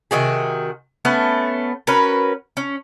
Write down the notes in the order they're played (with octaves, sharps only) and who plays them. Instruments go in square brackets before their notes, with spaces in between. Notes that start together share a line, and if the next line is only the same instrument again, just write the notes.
[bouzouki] C3 D#3 F#4 G#4
A3 B3 C#4
C#4 F#4 A#4 B4
C#4